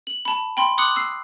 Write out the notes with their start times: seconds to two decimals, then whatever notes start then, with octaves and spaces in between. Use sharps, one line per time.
0.07 F#7
0.25 A5 B5
0.57 G5 B5 C6
0.78 C6 D6 D#6 F#6 C#7 F#7
0.96 E6 C7